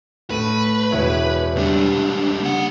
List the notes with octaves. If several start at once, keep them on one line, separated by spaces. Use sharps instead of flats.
A2 B4 D#7
E1 E4 C#5
C#2 G3 D4
A#3 F#5